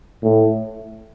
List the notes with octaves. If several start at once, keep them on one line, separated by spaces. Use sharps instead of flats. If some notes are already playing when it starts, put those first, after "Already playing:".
A2